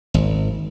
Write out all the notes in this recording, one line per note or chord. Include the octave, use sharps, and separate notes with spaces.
G#1